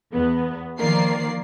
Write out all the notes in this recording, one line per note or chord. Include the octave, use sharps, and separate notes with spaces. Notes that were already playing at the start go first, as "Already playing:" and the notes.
E2 B3
D#3 F3 A#3 A#4 D5 C7